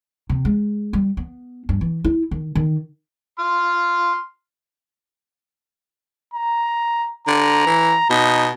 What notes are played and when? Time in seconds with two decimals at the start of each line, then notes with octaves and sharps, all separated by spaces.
0.30 C3
0.45 G#3
0.93 G3
1.17 B3
1.69 G2
1.81 E3
2.04 E4
2.31 D#3
2.55 D#3
3.39 C6 F6
6.34 A#5
7.27 D3 A#5
7.66 E3
8.10 B2 D#4